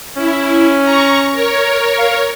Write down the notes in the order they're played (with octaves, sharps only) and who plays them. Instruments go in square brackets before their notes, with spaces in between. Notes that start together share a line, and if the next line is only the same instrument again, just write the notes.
[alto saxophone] C#4 [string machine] E4
[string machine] A#5 C#6
A#4 C#5
[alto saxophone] F5